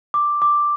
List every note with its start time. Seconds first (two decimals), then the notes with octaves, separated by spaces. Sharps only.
0.14 D6
0.42 D6